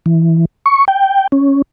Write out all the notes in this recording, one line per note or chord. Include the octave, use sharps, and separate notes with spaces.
E3
C#6
G5
C#4